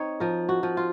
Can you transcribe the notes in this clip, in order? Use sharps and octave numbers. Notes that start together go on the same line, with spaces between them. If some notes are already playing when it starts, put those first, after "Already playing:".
Already playing: C4 D#4 C#5
F3 A#4
F#4
F3
F4